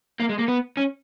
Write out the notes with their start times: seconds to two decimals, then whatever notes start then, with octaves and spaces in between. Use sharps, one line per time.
0.20 A#3
0.29 G#3
0.39 A#3
0.48 B3
0.77 C#4